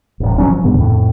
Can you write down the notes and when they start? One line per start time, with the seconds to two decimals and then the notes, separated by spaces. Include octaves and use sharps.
0.20 D#1 A1
0.38 G#1 F3 F#3 C#4
0.51 F3
0.64 D2 G2 C#3 B3
0.79 F2 A2